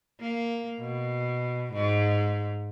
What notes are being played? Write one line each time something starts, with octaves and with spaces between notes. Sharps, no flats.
A#3
B2
G#2